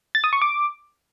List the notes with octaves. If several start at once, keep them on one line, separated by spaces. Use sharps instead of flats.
A6
D#6
C#6
D6